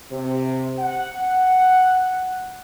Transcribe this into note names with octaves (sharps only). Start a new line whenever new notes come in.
C3
F#5